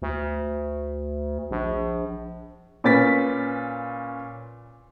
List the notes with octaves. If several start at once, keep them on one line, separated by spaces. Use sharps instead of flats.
D2
A#1
A#2 C#4 B4 A6 B6